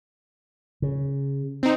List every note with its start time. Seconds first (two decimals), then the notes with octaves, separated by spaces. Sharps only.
0.82 C#3
1.63 C4 D#4